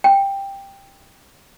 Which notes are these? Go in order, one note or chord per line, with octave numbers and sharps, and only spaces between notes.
G5